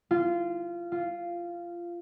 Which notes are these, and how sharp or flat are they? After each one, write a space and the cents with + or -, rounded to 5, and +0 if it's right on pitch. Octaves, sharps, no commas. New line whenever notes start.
F4 -20
F4 -10